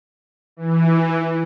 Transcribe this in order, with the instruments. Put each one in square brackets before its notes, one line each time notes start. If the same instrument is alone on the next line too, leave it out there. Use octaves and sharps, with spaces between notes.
[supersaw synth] E3